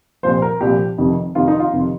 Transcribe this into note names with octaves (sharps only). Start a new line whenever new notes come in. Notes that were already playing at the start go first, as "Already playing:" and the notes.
C2 A#2 F3 C5
A#4
C2 A#2 F3 G4
F1 F2 C3 D#3
F1 F2 C3 D#3 F4
D#4
F4
F1 F2 C3 D#3